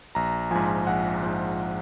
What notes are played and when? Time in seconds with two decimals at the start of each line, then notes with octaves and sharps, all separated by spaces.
0.15 A#1 A#5
0.51 G#2 F3 G#5
0.87 A#1 F#5
1.23 G#2 F3